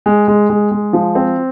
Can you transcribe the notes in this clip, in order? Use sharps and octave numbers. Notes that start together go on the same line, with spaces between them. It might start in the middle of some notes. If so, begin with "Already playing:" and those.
G#3
G#3
G#3
G#3
F3
C4